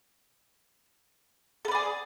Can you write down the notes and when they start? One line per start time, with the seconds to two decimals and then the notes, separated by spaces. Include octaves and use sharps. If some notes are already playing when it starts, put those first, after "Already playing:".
1.65 A4
1.68 B4
1.71 D5
1.75 G#4